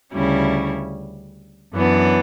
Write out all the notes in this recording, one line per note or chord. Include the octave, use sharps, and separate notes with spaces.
D2 C#3 G3 C#4 E4
F#2 E3 B3 D4